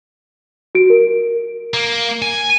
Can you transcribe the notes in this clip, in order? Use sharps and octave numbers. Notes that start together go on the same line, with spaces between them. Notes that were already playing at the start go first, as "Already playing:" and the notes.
F#4 D7
A#4
A#3
G#5